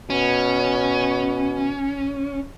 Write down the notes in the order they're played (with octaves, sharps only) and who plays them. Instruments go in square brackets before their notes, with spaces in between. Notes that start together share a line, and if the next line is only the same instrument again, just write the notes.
[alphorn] B2 [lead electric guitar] C#4